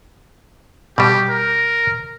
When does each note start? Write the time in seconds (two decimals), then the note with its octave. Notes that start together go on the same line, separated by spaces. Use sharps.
0.98 B2 G3 G4
1.29 A#4